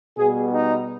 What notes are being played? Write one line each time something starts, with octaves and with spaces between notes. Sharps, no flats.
B2 G3 B3 G#4
D#4